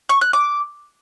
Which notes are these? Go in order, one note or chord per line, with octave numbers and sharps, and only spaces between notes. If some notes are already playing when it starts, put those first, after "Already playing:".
C#6
F#6
D6